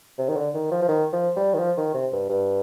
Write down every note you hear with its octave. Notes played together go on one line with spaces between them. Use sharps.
C3
D#3
D3
D#3
F3
F3
D#3
F3
G3
D#3
F3
D#3
C3
G2
G2